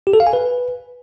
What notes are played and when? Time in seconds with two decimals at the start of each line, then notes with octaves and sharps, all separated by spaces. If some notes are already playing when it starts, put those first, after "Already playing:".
0.07 G4
0.13 A4
0.20 F5
0.27 G#5
0.33 B4